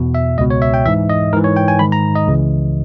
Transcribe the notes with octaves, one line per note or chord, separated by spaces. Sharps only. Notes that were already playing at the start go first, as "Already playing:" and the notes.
Already playing: E2 B2
E5
C#2 B2 D#5
C#5
E5
G5
G#2 E3 E5
D#5
G#2 E3 A#4
C#5
G5
G#5
G#2 D#3 B5
A#5
D#5
C#2 C#3 E3